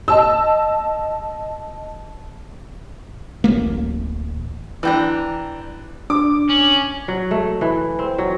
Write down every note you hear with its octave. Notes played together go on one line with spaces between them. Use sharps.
D#5 A5 E6
D1 A1 A3 A#3
E3 D4 D5 G5 A#5
D4 D6
C#4 F#7
F#3
A3
E3
C4
F#3